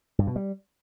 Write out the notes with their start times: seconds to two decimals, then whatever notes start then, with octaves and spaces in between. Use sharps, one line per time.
0.19 G2
0.27 B2
0.36 G3